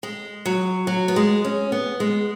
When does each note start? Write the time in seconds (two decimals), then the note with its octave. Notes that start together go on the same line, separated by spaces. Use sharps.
0.03 G#3
0.46 F#3
0.87 F#3
1.08 B3
1.16 G#3
1.44 C#4
1.72 B3
2.00 G#3